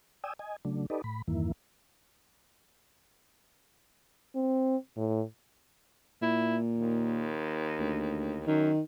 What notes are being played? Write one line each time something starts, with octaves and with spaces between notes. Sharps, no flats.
D5 G5 G#5 D#6 E6
D#5 G#5
C#3 F#3 A3 D4
D#4 G4 A4 B4 D5 D#5
A2 B5
E2 G2 D#3 E3 A#3 E4
C4
A2
A#2 E4
D#2
D2
F#2 D#3